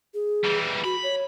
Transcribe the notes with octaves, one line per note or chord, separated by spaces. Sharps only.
G#4
E3 G3
F#4 B5
C#5